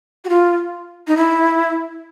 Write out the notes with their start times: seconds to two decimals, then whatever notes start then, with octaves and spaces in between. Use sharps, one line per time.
0.25 F#4
0.29 F4
1.07 D#4
1.17 E4